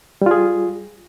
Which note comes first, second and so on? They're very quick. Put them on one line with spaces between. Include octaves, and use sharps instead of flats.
G3 F4 G#4